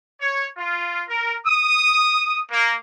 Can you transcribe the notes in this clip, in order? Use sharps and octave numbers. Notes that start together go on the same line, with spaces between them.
C#5
F4
A#4
D#6
A#3